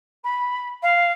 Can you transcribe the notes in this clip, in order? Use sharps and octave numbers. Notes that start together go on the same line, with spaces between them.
B5
F5